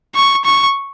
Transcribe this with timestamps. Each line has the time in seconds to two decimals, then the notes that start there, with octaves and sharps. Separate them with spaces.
0.15 C#6
0.45 C#6